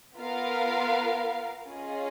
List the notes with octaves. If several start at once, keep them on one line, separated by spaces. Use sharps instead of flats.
B3 F4 A#4 F5
C#4 F4 G#4 D#5